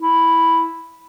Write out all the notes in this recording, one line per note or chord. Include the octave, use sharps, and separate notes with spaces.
E4